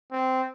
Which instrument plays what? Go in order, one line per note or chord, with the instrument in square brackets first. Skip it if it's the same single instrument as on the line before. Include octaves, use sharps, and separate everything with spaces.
[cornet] C4